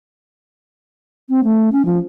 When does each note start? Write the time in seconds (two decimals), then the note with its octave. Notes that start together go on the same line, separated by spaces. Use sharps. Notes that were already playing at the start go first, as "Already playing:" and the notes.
1.29 C4
1.44 A3
1.72 C#4
1.85 F3